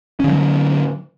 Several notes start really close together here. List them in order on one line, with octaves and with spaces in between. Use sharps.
C#4 D3 F3 F#3